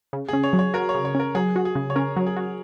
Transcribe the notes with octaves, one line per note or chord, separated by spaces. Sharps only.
C#3
C#4 G#4
C#5
F#3
C#5
F#4 A#4
C#5
C#3
C#5
C#4 A#4
F#3 G#4
F#4
G#4
C#3
C#5
C#4 A#4
F#3
G#4
F#4